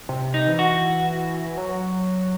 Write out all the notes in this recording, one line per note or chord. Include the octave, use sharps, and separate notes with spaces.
C3
D#4
E3
F#4
F#3